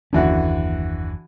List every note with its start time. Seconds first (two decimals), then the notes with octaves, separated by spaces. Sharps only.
0.13 F#1 D#2 D3 E3 C#4 F#4